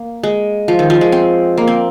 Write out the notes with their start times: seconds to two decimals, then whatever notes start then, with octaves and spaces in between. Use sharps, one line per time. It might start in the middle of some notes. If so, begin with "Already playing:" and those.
Already playing: A#3
0.23 G#3
0.68 F3
0.79 D#3
0.90 F3
1.01 G#3
1.12 C4
1.58 A#3
1.68 C4